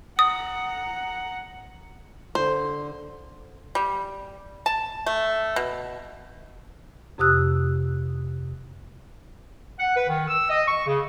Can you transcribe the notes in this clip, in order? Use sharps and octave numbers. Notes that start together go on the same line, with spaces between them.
F#5 A#5 D#6
D3 C5
G3
A5
A3
B2
F2 C3 G4 D#6 E6 F#6
F#5
B4
D#3
E6
D#5
C#6
C#3